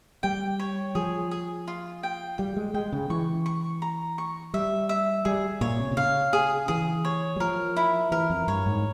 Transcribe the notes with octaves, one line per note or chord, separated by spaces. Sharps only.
G3 G5
C#5
F3 G#4
G#4
F4
G5
G3 G5
G#3
G#3 G5
C#3
E3 C#6
C#6
A#5
C#6
G3 E5
E5
G3 G#4
A#2 C#5
C3
C3
C#3 F5
G#4
E3 G#4
C#5
G3
F3 A#4
E4
E3 A#4
F2
G2 C#5
G#2